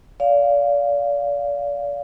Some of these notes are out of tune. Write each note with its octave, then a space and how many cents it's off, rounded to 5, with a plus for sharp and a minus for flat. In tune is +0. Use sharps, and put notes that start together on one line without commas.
D5 -35 F5 +0